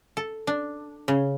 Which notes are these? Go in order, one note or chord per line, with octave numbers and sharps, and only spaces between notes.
A4
D4
C#3